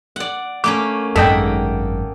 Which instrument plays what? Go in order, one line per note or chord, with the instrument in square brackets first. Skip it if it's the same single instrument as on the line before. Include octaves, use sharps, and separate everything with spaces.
[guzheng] D5 F#5
[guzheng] A3 A#3 C#4 [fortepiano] D6
[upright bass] G#1 F#2 [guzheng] A#3 E5 F#5 [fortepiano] A4 D#5 G5